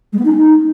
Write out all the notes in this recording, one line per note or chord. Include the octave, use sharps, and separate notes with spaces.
G#3
B3
D#4
C#4
D#4